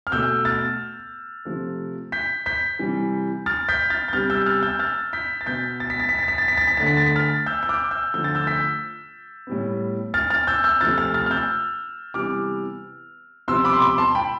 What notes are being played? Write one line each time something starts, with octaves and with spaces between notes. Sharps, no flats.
F6
B2 A3 E6 G6
F6 A6
C3 F3 A3
G6 B6
G6 B6
C3 E3 G3
F6 A6
G6 B6
F6 A6
G6
C3 G3 B3 F6 A6
E6 G6
F6 A6
E6 G6
F6 A6
G6 B6
A6
B2 B3 G6 B6
A6
B6
A6
B6
A6
B6
A6
B6
A6
B6
D3 A3 A6
B6
A6
B6
F6 A6
E6 G6
G6
D6 F6
E6 G6
D3 F3 A3 G6
A6
E6 G6
G6 B6
A2 G3 B3
F6 A6
F6 A6
E6 G6
E6 G6
C3 F3 A3 F6 A6
F6 A6
F6 A6
F6
E6 G6
C3 E3 G3 B3 D6 F6
C3 F3 B3 C6 E6
B5 D6
C6
B5 D6
A5 C6
G5 B5